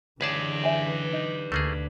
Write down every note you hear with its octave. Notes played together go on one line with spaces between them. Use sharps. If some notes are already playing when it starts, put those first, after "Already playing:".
C#2 D3 E3 G#4 B4 D5 A5
E5 G#5
D#4
D2 D3 A3 A#3 G#4